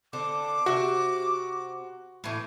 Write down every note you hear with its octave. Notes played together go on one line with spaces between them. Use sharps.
D3 C4 A4 D6
C3 F#4 E5
A2 E3